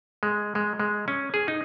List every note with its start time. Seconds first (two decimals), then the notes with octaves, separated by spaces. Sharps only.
0.23 G#3
0.55 G#3
0.80 G#3
1.08 C#4
1.34 G#4
1.48 D#4